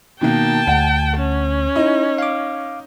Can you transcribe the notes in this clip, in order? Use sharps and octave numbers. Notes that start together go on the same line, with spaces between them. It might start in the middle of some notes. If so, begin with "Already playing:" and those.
B2 D#3 A#3 G5 A5
D2 F#5
C#4
D#4 E4 D#5
F5 D6